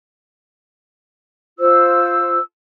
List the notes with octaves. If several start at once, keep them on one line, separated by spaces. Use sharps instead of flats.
F4 C5 E6